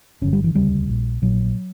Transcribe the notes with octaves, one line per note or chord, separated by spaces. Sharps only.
G1 F#2 D3 C#4
G3
E3
E1 D2 C#3 G3
A#1 A#2
A#1 A#2 F#3